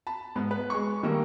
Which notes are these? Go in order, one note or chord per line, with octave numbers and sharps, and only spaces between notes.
A5 B5
G#2 B3
B4
G#3 C#6
D#3 G3 A3 A#3